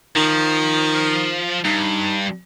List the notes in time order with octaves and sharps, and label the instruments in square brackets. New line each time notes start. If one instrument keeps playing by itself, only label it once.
[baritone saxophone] D#3 [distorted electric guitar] F3
[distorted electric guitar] G2 [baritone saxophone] D#4